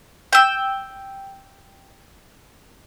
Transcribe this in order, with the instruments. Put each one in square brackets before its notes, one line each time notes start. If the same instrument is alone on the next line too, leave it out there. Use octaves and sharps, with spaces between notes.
[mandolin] G5 E6